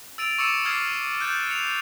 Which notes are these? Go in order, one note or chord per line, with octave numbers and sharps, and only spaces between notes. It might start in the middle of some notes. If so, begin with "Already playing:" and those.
E6 A6 D7 D#7 F7
C#6 D6 E6 A6 C#7 E7
D6 D#6 F6 G#6 A6 C7
F#6 G6 A6
C#7 F7